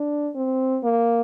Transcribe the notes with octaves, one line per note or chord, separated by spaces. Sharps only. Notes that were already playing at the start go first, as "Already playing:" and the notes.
Already playing: D4
C4
A#3